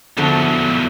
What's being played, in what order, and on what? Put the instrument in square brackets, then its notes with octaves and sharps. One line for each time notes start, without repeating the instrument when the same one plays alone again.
[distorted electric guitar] E2 F#3 [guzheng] D3 F3 A3